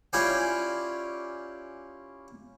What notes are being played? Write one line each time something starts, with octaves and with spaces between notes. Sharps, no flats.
C#4 E4 F4 G4 D5 G#5